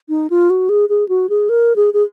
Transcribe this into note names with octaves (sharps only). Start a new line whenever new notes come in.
D#4
F4
F#4
G#4
G#4
F#4
G#4
A#4
G#4
G#4